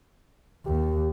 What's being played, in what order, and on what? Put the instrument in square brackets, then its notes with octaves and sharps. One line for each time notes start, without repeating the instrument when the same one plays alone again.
[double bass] D#2 [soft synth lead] G4